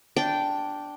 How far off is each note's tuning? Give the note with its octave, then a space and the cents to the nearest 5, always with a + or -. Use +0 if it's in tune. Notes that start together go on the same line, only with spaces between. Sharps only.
D4 -5 G5 -10